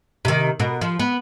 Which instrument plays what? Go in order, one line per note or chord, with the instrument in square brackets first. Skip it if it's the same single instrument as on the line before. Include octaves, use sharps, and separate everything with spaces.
[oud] C3 D#3
B2 A#4
F3
B3